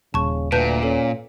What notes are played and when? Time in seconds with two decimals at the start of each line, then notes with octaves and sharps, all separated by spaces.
0.14 D#1 C#3 A5 C#6
0.52 D2 A#2 B4 A5 G6
0.83 C#4 A4